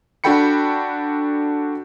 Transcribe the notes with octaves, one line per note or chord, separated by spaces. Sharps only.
D4 F#4 A4 G5 B5 C#7